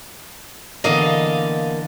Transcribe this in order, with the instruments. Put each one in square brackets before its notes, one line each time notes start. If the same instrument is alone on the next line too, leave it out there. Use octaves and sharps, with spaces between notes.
[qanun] D3 E3 B3 [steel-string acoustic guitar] A#3 D#5 F5